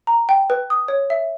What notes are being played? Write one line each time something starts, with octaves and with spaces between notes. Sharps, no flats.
A#5
G5
B4
D#6
C#5
E5